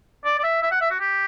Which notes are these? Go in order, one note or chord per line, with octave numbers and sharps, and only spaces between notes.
D5
D5
E5
E5
F#5
E5
F#4
G4